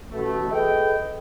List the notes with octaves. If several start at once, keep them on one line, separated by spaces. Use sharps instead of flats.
A1 B2 A3
G#4 A4 B4 D#5 G5